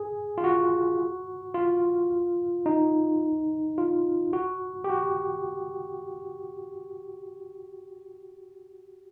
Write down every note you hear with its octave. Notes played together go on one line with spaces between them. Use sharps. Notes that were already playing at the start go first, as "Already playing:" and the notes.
Already playing: G#4
F4
F#4
F4
D#4
F4
F#4
G4
F#4